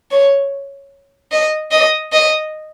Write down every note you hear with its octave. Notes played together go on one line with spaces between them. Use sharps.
C#5
D#5
D#5
D#5